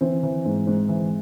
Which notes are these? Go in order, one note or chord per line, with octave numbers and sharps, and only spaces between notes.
E3 C4
E3
G#2
G#2
E3